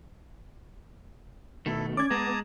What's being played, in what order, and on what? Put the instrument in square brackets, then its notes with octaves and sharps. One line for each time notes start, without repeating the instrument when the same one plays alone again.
[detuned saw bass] B2 [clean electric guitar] D#3 A3 [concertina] E4 A4
[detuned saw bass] C#4 [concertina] D5 [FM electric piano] D6 G#6
[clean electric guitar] G#3 [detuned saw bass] B3 [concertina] A5 A#5 D#6